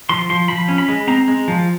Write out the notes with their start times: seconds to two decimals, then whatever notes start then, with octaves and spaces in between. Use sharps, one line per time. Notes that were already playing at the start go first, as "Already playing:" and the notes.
0.09 F3 C6
0.30 F3 C6
0.48 F3 B5
0.68 C#4
0.78 B5
0.88 G#3
1.07 C4 A#5
1.28 G#3
1.48 F3